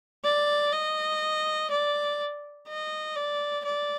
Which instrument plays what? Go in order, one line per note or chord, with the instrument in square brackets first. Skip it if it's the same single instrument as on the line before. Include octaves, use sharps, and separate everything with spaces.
[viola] D5
D#5
D5
D#5
D5
D5